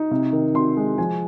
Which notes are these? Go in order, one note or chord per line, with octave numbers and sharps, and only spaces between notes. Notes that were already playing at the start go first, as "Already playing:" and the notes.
Already playing: D#4
C3
D#3
C3 C6
G#3
F3 G#5